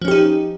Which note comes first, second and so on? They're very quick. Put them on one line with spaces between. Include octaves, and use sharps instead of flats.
F3 C#4 G4 D#4